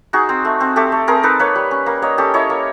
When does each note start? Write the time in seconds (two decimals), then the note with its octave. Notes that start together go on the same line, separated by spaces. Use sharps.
0.13 D#4 F#4 G#4
0.29 C4
0.45 A3
0.61 C4
0.76 A3 G4 A4
0.92 A3
1.07 C4 G#4 A#4
1.23 D#4 A4 B4
1.39 A#3 B4 C#5
1.55 G3
1.71 C#4
1.86 A#3
2.02 A#3 C#5 D#5
2.18 C#4 G4 A4
2.34 E4 C#5 D#5
2.50 A#3